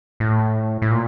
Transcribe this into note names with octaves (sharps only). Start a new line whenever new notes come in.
A2
A2
A#2